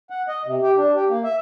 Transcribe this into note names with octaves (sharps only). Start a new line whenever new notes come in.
F#5
D#5
C3
G4
D4
G4
A#3
E5